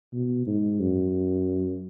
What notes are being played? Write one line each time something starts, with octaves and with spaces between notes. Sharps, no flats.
B2
G#2
F#2